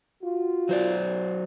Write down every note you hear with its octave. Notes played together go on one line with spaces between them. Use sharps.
F4 F#4
F#3 C5 D5